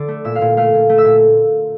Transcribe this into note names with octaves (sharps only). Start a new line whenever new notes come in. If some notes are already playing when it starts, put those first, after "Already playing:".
Already playing: D3 D5 D6
A3
A#2 E5 E6
F5 F6
A#2
A3 F5 F6
A#2
A3
E5 E6
A#2